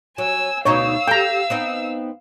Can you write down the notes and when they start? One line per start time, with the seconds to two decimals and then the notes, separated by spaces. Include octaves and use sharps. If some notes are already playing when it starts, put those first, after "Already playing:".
0.18 F#3 G#5 E6
0.65 D2 B2 D#4 C#5 F5 E6
1.08 G4 A4 G5 A#5
1.50 B3 C4 D#4